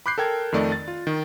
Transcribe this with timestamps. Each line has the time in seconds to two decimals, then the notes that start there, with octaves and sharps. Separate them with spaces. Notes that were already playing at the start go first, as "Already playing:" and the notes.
0.06 B5 D6 F#6 G6 C7
0.18 A4 A#4 G5 G#6
0.52 F2 D#3 A3 D5 D#5
0.72 A6
0.88 F4
1.07 D#3